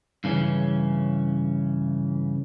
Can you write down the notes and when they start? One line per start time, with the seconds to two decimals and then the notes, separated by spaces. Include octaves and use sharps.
0.24 G2 C#3 E3 C#4